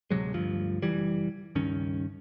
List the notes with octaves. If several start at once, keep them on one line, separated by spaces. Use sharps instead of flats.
D1 C3 F#3 G#3
D2 G2 F3
F#1 E3 G3
C#2 G2 D#3 C#4